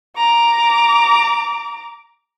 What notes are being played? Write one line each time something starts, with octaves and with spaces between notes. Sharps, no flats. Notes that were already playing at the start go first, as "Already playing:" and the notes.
A#5 D6